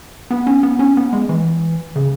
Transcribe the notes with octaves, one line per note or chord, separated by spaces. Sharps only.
B3
C#4
B3
C#4
B3
G#3
E3
C#3